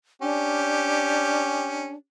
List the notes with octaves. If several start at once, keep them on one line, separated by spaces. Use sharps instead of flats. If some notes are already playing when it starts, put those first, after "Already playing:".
C#4 D4 G4